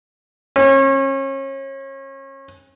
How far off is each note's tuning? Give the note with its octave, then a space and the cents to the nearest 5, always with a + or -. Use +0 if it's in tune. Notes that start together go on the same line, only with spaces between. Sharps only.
C#4 -35